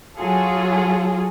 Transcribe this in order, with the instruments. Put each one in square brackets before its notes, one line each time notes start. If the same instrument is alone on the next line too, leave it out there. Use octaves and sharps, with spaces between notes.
[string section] F#3 F4 F#4 G#4 A4